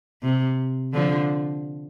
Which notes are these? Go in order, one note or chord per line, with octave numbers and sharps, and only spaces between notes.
C3
D3 F3